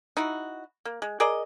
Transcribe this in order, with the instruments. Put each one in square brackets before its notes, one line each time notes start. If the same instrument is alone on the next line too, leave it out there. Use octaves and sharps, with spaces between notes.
[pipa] D#4 E4 F#4
A#3
G#3
G#4 A#4 D5 D#5